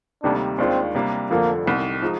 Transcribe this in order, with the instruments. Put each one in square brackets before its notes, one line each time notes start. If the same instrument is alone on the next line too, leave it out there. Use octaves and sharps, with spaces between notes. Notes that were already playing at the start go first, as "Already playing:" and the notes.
[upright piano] D2 C3 D#3 G3 A#3 [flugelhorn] D4
[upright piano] D#2 D#3 G#3 D4 F4 [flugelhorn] C4
[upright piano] C3 G3 A#3 D4
[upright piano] F1 F2 D3 F3 [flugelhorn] A#3
[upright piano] C2 C3 D#3
F3 G#3 D#4